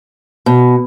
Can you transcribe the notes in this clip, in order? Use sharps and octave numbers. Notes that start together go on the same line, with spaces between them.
B2